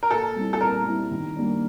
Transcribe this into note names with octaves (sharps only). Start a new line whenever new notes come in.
A#4
A#2 A4
G3 C4 E4
A4
A#2 A#4
G3 C4 E4
D#3
G3 A#3 D4